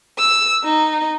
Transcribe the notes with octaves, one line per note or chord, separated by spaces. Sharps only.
E6
D#4